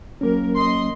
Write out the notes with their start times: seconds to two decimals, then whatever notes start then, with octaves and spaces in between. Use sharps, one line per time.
0.21 F#3 A#3 C#4 A#4
0.56 D#5 C6